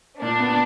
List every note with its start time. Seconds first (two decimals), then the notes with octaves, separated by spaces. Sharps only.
0.21 A#2 D4
0.39 B3